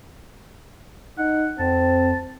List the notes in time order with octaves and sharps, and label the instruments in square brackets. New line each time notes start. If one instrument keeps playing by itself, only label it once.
[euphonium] D#4 [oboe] F#5
[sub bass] F2 [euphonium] C4 [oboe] A5